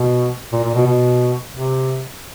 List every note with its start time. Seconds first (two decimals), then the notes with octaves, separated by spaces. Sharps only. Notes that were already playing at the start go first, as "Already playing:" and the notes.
Already playing: B2
0.53 A#2
0.64 A#2
0.75 B2
0.86 B2
1.54 C3